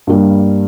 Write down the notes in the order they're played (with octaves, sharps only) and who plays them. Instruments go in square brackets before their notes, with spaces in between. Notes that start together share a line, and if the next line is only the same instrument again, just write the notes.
[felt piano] G2 G3 A#3